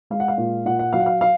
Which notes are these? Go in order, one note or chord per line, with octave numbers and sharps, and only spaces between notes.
G#3 F5
F#5
F5
A#2
A#2 F#5
F#5
F#3 F5
F#5
F5
F5